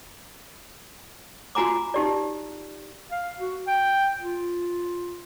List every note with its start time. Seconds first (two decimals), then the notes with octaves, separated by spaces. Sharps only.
1.55 F4 F#4 G#5 A#5 D6
1.94 D#4 G4 D5
3.11 F5
3.38 F#4
3.67 G5
4.20 F4